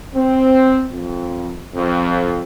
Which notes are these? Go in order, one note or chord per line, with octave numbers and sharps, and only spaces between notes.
C4
F2
F2